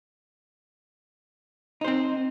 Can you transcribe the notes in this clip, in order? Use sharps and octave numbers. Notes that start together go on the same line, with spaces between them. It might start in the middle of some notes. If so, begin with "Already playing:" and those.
C4 D#4 C5